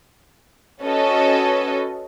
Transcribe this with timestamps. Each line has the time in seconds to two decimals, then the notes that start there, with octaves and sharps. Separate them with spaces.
0.83 C#4 F#4 A4 B4 C#5 D#5